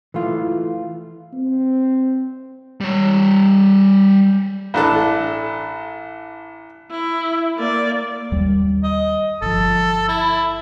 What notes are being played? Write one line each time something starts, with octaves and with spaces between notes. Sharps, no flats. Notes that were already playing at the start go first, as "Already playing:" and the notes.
E3 A3 F4
C4
G3 C#5
A1 D4 A4
E4
A#3 D5
D#2 G3
D#5
G1 F3 A4
E4